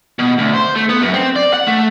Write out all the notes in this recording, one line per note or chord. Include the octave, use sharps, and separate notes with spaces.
B2
D2
C5
A3
B3
F#2
C4
D5
F#5
A3